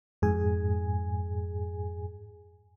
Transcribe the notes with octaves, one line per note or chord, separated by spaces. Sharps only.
F2 G#2 G#4 G#5